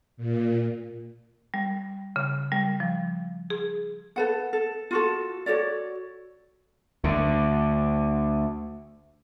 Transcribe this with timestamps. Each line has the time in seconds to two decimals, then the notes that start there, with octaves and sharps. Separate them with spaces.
0.17 A#2
1.54 G3
2.16 C#3
2.52 G3
2.80 F3
3.50 G#4
4.16 A4 B4 F#5
4.53 A4
4.91 F4 F#4 A4
5.46 F#4 A4 C#5 D5
7.04 D2 D3